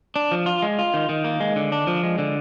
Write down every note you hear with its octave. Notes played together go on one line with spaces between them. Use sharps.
D4
F3
F4
G#3
F4
D#3
D#3
A#3
G#3
D3
D4
F3
G#3
D3